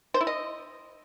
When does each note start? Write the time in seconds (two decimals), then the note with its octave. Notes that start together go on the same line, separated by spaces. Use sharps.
0.14 C5
0.21 E4
0.27 D#5